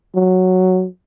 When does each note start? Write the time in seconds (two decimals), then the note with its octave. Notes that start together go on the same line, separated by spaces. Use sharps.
0.15 F#3